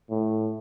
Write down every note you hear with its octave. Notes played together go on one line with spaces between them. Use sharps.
A2